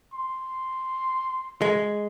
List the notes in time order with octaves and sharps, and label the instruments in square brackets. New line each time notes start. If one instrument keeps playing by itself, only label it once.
[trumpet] C6
[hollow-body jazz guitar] G#3